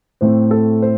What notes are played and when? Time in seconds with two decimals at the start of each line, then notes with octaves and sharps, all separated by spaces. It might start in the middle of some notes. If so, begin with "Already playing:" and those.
0.21 A2 A3 C4 C5
0.51 A4
0.82 C5